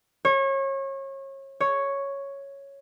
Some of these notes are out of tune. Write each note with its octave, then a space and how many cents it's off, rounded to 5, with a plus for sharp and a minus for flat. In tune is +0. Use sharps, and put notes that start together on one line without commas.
C#5 -30
C#5 +0